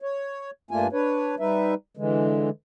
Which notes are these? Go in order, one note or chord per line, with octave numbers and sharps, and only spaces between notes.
C#5
G2 A3 A#3 D4 F4 G#5
D4 B4 C#5
G3 D#4 B4 E5
D3 E3 G#3